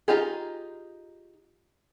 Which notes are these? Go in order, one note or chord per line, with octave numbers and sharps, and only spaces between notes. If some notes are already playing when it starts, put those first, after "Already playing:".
D#4 F4 G4 G#4